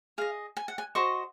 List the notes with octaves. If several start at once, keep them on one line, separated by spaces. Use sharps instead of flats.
G#4 D#5 F5
G#5
F#5
G#5
F#4 C5 D#5 C#6